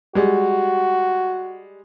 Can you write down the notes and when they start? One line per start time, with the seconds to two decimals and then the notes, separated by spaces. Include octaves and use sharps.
0.15 G3 G#3 F#4